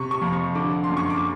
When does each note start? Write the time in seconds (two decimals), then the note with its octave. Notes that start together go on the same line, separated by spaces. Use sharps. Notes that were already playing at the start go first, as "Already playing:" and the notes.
Already playing: C3 C#6
0.11 C#6
0.22 F2
0.33 C#6
0.55 D3 D6
0.84 C6
0.89 F#2
0.97 C#6
1.10 D6